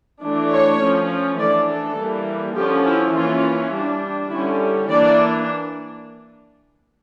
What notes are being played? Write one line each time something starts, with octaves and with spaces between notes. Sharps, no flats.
E3 A3 D4
C#5
F3 C#4
E3 A3 D4 D5
A4
E3 G3 A#3
D3 F3 C#4 G4
E4
E3 A#3 C#4 F4
G3 D4
D3 G3 C#4 E4
E3 A#3 D4 D5